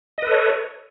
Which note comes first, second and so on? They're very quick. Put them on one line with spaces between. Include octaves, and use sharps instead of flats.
D#5 B4 A4 C#5